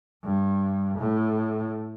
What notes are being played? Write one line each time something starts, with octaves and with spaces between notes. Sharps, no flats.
G2
A2